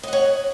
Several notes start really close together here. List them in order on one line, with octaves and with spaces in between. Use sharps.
D#5 F#5 C#5